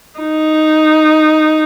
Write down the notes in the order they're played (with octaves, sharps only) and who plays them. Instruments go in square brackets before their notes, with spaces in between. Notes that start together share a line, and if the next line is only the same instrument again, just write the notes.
[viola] D#4